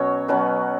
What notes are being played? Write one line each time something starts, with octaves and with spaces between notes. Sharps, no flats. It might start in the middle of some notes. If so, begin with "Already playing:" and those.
Already playing: B2 F#3 C#4 C#5
B2 F#3 C#4 B4